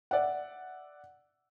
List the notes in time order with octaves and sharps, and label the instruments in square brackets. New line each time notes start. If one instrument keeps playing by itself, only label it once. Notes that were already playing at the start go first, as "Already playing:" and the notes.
[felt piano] D5 E5 F#5